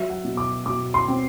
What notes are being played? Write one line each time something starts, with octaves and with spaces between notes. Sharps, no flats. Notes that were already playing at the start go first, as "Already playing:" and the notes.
Already playing: F#3 E5
F#5
B2
D6
B2 D6
C6
C4